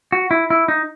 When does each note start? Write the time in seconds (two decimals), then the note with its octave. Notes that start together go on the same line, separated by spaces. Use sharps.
0.12 F#4
0.31 E4
0.50 E4
0.68 D#4